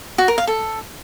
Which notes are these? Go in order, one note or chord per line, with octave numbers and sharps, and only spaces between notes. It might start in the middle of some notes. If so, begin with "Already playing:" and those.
F#4
A#4
F5
A4